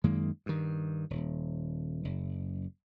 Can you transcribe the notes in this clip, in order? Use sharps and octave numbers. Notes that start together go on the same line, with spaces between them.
F#2 D#3 G#3 A#3
G2 D#3
D#1
F#1